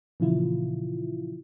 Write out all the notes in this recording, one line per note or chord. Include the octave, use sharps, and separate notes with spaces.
A#2 C#3 E3 F3 E4 F4